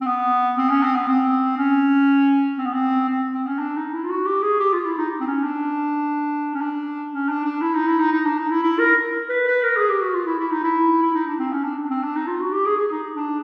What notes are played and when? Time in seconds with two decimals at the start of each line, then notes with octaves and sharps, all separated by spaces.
0.01 C4
0.06 B3
0.57 C4
0.69 C#4
0.83 C4
0.95 B3
1.07 C4
1.57 C#4
2.58 C4
2.66 B3
2.73 C4
3.09 C4
3.33 C4
3.47 C#4
3.59 D4
3.77 D#4
3.93 E4
4.04 F4
4.10 F#4
4.26 G4
4.42 G#4
4.60 G4
4.73 F4
4.85 E4
4.98 D#4
5.20 C4
5.27 C#4
5.44 D4
6.54 C#4
6.61 D4
7.12 C#4
7.29 D4
7.45 D4
7.61 E4
7.74 D#4
7.88 E4
7.99 D#4
8.12 D#4
8.25 D4
8.37 D#4
8.50 E4
8.63 E4
8.79 A#4
9.29 B4
9.47 B4
9.63 A#4
9.76 G#4
9.89 G4
10.01 F#4
10.14 F4
10.26 E4
10.39 E4
10.51 D#4
10.64 E4
11.02 E4
11.14 D#4
11.27 D4
11.39 C4
11.52 C#4
11.64 D4
11.77 D4
11.90 C4
12.03 D4
12.15 D#4
12.27 F4
12.40 F#4
12.52 G4
12.66 G#4
12.77 G#4
12.91 D#4
13.15 D4